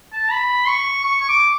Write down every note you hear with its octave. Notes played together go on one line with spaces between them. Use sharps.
A5
B5
C#6
C#6
C#6
D6